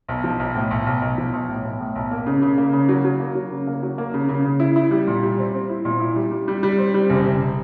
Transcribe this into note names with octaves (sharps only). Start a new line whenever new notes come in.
B1
F3
B1
A2
B1
B1
B1
F3
B1
A2
B1
A2
B1
A#3
C#3
C#3
A#3
C#3
F#3
F#3
A#3
F#3
C#3
A#3
F#3
A#3
C#3
C#3
C#3
E4
E4
G3
A#2
G3
C4
C4
E4
A#2
E4
G3
G3
G3
G3
C4
G3
F#1
F#1